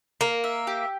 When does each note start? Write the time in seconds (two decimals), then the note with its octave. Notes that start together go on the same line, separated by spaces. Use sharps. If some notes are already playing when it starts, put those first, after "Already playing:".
0.21 A#3 A#4
0.44 E5
0.67 G4